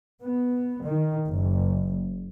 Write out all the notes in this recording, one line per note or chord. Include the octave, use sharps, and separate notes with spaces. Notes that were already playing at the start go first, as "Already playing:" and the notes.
B3
D#3
F#1